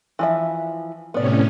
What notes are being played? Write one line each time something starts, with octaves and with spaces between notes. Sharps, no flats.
E3 F3 E5
A2 C3 B3 C#4 D5